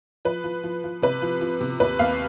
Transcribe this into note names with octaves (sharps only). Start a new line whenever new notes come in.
F3 B4
F3
F3
F3
C3 B4
F3
F3
C3
D#2 B4
D#2 F5